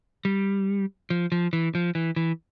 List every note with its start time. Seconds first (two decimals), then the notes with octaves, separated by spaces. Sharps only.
0.25 G3
1.10 F3
1.32 F3
1.53 E3
1.75 F3
1.95 E3
2.16 E3